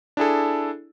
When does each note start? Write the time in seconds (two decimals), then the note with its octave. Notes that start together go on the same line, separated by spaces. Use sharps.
0.17 D4 E4 G#4 A4